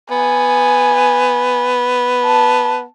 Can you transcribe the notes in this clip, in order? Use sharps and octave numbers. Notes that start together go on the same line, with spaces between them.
B3 G#5
A5